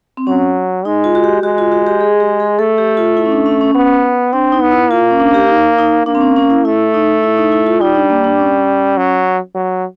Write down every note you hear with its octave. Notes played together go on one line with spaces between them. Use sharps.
C4
F#3 C#4
G#3 D#4
F4
F#4
G4
G#3 F#4
F4
F#4
G4
G#4
G4
G#4
A3 A4
G4
F4
E4
C#4
D4
C#4
C#4
B3 C#4
C4 D4
D#4
B3
E4
A#3 F4
C#4
D4
G4
D#4
D#4
A#3 D4
C4
C#4
C#4
E4
A3 E4
D#4
E4
D#4
E4
F4
G3 D#4
D4
A#3
D4
C#4
F#3
F#3